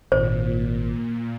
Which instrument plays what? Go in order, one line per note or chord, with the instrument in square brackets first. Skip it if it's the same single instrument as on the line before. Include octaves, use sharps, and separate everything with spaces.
[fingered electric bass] G#1 [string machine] A#2 [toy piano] C5